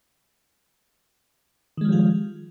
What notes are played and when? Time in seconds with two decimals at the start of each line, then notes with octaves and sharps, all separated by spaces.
1.77 D#3
1.81 G#3
1.85 F3
1.89 G3
1.92 F4